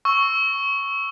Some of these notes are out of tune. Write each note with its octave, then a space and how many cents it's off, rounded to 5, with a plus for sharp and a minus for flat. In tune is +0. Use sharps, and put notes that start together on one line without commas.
C#6 +0 E6 +0